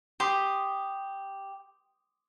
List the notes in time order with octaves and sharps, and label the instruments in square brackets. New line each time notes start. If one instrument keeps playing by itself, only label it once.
[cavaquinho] G4 [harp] C6 D#6 B6